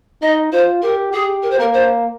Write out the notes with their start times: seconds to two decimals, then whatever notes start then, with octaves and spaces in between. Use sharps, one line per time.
0.22 D#4 D#5
0.52 F4 C5
0.82 G4 A#4
1.13 G4 G#4
1.43 A#4
1.51 C5
1.58 A#3 A#4
1.74 C5